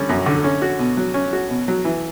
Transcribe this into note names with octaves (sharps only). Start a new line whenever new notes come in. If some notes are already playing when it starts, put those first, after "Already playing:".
Already playing: D3 G3 C#4
F#2
D3
C#4
F#4
B2
F#3
C#4
F#4
B2
F#3
E3